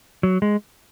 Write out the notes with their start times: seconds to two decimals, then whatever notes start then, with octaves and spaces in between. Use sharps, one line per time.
0.23 F#3
0.42 G#3